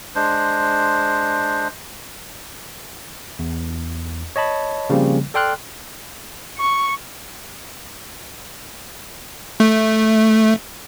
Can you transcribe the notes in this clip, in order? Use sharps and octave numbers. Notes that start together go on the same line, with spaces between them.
G#3 D4 C5
E2
C#5 D#5 A5 B5
C#3 F3 G3 A#3 C4
A4 D5 G5 C6 F6 F#6
C#6
A3